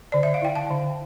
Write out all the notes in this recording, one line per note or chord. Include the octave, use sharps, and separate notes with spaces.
D3 D5
E5
F5
E4 G5
F5 A5
D3